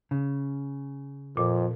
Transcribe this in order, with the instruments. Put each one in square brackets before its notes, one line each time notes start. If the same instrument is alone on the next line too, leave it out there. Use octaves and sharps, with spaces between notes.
[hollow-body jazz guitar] C#3
[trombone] F2 [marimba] A#2